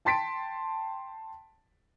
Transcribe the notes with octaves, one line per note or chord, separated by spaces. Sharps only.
G5 A5 C6 A6 B6 D7